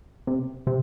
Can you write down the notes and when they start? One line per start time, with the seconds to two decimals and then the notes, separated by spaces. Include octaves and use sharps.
0.27 C3
0.67 C3